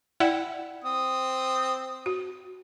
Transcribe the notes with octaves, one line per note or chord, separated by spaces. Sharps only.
E4 D5 F#5 G5
C4 D#6
F#4